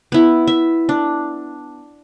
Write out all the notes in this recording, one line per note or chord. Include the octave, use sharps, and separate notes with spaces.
B3 E4
E5
D4